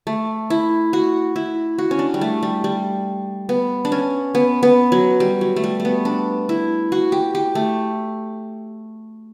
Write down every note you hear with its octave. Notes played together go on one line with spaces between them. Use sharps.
A3
E4
F#4
E4
F#4
C#4
D4
G3
A3
G3
G3
B3
D4
C#4
B3
B3
F#3
G3
F#3
A3
G3
A3
B3
D4
E4
F#4
G4
G4
A3